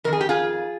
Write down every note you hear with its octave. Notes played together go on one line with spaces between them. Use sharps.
F2 D#3 A#4
G#4
G4
F4 G#4